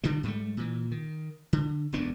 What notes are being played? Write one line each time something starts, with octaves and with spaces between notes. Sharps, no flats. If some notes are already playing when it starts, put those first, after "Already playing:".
D3 D#3 G3
G#2 G3 A3
A#2 E3
D#3
D3
E1 D2 B3 D4